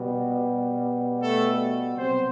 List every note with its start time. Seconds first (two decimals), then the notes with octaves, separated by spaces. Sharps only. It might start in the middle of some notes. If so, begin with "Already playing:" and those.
Already playing: B2 G3 B3
1.22 A3 A4
1.97 C3 F#3 B3 C4 C5